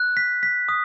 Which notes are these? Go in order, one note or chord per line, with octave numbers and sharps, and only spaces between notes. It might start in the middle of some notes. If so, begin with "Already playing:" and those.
Already playing: F#6
B6
B6
D#6